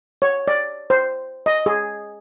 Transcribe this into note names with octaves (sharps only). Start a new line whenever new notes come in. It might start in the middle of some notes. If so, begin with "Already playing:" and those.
C#5
D5
C5
D#5
G#4